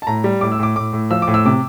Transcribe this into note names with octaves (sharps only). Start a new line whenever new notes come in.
A5
A2 A#5
G3
A2 D6
E6
A2 D6
A2 D6
A2
F3 E6
D6
A2
E6
C3 D6